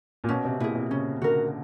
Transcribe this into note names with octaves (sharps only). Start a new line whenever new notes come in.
A#2
B2 C#4
C3
A#2 E4 G#4
C3
C#3 C#4
D3 F#4 A#4